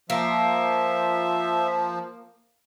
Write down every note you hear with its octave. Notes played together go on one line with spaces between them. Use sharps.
F3 A#3 E5